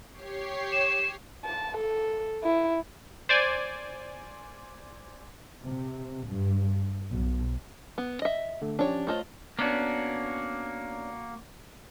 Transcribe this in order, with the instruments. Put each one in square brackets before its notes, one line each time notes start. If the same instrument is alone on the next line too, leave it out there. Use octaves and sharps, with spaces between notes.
[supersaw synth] G4 C#5 C7
[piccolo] E7
[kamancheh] A5
A4
E4
[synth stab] C5 D5 G#5
[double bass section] C3
G2
B1
[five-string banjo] B3
D#5 E5
[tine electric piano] D3 A3
[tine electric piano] F3 C#4 G4 [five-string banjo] D4 C#5
[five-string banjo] A3 F4 D#5 [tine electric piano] C5 C#5 A5
[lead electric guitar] A#3 F#4 [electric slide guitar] B3 C#4 D4